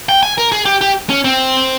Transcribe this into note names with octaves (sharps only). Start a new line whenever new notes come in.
G5
G#5
A#4
G#4
G4
G4
C#4
C4